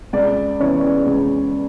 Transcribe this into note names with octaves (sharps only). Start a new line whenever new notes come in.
C#2 D5
C#3 E3 B3 C#5
C#2